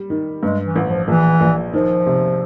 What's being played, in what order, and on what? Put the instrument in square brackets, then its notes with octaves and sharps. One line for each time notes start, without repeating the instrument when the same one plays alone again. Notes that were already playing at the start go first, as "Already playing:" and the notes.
Already playing: [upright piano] G3
D#3
[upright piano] G2 [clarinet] G#3
[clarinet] E3
[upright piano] A1
[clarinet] F3
[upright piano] A#1 [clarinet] E3
[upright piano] A#1
[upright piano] D#3 [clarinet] F3
[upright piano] C3